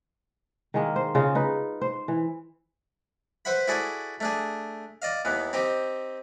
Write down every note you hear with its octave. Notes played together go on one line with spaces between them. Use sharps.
D#3 G#3 A#3
C5
C#3 F4 D#5
D#4 B4
C5
E3
B4 C5 E5 F#5 B5
E4 F#4 G#4 A4 D5
A3 D4 G#4
D5 D#5 F5
D#2 E3 B3
C4 D#4 G4